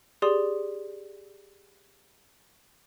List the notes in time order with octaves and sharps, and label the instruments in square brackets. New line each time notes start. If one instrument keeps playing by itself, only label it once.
[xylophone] G4 G#4 D5 C6 D#6